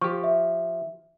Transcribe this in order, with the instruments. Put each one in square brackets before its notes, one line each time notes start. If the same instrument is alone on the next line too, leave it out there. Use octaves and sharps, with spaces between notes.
[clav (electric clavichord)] F3 G4 [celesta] C#6
[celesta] E5